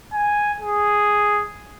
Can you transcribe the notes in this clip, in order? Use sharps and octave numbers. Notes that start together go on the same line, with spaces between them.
G#5
G#4